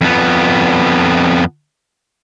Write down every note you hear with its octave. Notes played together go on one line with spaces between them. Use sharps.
F2 B3